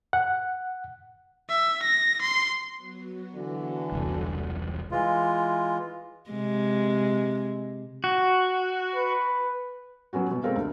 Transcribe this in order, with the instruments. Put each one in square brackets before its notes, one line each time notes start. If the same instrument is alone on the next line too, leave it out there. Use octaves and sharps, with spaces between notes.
[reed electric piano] F#5
[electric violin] E5
A#6
C6
[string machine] F#3 B3 F#4
[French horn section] D3 E3
[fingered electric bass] E1 C2
[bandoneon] E3 G#3 F4
[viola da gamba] C3 G#3
[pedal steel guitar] F#4
[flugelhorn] B4
[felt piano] F#3 B3 C#4 F#4
B2
G#3 C4 A4 A#4 F5
D2